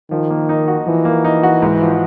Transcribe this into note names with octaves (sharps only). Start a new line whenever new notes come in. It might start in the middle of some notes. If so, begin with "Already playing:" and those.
D#3 F3
A#3
D#4
F#4
E3 F3
A#3
D#4
F#4
G#2
F3